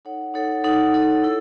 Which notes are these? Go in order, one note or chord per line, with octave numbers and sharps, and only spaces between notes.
D#4 A4 C#5 F#5
D#4 A4 C#5 F#5
D#4 A4 C#5 F#5
D#4 A4 C#5 F#5
E4 A4